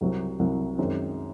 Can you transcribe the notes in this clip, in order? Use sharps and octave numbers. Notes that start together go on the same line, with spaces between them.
C2 C3 F#3 C4
C2 C3 F#3 C4
F#2 D#3 G#3 C4